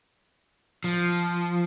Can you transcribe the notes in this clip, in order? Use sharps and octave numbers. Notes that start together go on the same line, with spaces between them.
F3